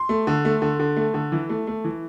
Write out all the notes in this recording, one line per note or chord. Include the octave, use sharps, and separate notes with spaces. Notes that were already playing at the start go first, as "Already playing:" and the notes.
Already playing: C6
A3
D3
A3
D3
D3
A3
D3
E3
A3
A3
E3